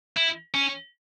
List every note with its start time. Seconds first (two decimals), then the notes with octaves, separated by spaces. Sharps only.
0.16 E4
0.54 C#4